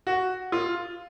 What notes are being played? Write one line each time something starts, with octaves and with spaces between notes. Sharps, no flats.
F#4
F4